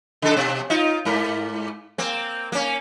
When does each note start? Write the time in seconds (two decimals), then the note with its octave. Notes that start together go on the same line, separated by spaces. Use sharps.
0.22 C#3 A4
0.36 B2
0.70 D#4 F4
1.05 G#2 A#4
1.98 A#3 C4
2.52 A#3 C#4